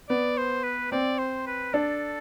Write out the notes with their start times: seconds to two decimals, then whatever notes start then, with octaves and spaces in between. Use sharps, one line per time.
0.09 B3 D5
0.37 C5
0.64 B4
0.92 C4 D5
1.18 C5
1.47 B4
1.73 D4 A4